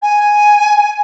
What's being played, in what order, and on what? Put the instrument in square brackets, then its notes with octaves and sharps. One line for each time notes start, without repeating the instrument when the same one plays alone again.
[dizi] G#5